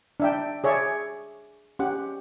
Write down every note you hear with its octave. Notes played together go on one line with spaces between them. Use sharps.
D4 E5 G5
G#4 C#5 D5 E5
C#4 G4 F#5